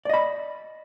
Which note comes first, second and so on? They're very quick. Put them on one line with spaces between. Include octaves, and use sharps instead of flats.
D5 D#5 B5